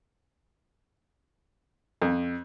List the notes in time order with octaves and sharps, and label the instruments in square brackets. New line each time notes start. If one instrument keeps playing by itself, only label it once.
[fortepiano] F2